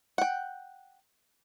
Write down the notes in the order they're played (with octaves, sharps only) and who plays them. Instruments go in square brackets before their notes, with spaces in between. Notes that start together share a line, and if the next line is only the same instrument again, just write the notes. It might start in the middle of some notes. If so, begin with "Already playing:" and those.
[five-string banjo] F#5 G5